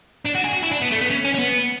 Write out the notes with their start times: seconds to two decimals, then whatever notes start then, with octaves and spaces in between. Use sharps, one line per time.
0.25 D4
0.35 F#4
0.44 G#4
0.53 F#4
0.63 E4
0.72 D4
0.82 B3
0.92 A3
1.01 B3
1.10 C#4
1.25 C#4
1.35 C#4
1.39 B3